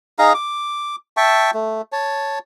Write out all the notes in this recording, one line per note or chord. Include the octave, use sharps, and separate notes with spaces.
D#4 G#4 F5 A#5
D6
E5 G5 A5 C#6
A3
C#5 A5